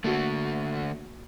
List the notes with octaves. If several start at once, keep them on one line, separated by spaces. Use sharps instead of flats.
D3 A3 A#3 F#4